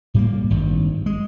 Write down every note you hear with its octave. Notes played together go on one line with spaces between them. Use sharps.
A2 G3 A#3
G#1 G2
G#3